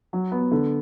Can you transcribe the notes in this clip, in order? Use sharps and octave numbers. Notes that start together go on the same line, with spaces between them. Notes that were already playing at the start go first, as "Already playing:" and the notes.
F#3
B3
D3